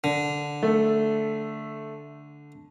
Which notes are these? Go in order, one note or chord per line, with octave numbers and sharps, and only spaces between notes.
D3
A3